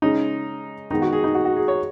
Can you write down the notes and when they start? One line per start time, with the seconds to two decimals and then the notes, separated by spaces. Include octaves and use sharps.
0.02 C#3 G#3 C#4 D#4
0.91 D#3 G#3 B3 D#4
1.02 F#4
1.13 G#4
1.24 D#4
1.35 F#4
1.45 F#4
1.57 G#4
1.68 C#5